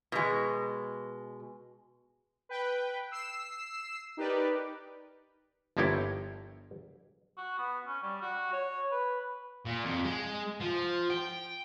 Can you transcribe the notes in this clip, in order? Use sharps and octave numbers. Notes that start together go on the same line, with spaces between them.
B2 G#3
B4 G5
E6 C7 E7
D#4 G4 A#4 B4 D5
G1 F3 A#3 E4 C#5 G5
F#4
B3
C#4
G3
F#4
C#5
B4
A#2
F2
G#3
F3
G5